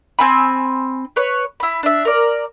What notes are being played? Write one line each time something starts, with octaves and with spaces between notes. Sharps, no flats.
C4 G#5 B5
B4 C#5
E4 B5
D4 E5
A#4 D5